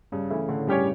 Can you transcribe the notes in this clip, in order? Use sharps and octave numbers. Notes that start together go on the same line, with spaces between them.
G2 C#3
E3 A3 E4
A2 D3
G2 G3 C#4 G4 C#5